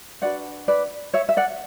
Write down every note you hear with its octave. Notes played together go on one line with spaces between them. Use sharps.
D4 F#4 B4 D5 F#5
B4 D5
C#5 E5
E5
D5 F#5